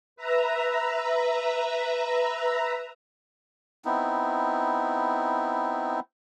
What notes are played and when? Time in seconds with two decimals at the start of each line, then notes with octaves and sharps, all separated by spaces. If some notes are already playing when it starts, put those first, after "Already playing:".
0.16 B4 E5 A#5
3.85 B3 C4 D#4 E4